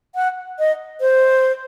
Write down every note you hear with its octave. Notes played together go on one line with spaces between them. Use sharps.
F#5
D#5
C5